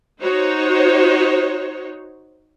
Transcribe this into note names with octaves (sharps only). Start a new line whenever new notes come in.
D#4 F#4 C5 C#5